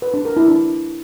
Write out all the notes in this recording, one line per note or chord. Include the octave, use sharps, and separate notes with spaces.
B4
D4
A#4
E4
D4